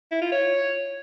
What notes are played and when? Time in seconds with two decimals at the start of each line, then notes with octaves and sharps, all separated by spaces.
0.11 E4
0.22 F4
0.32 C#5